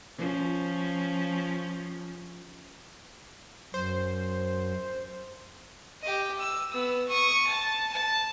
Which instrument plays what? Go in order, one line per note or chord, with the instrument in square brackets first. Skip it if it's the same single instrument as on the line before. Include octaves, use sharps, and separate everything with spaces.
[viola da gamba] F3 C#4
[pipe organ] F#2 [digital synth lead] C5
[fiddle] G4 D#5
E6
B3 E6
C#6 D#6
A5
A5